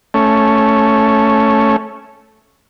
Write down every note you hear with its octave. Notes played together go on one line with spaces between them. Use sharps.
A3 C#4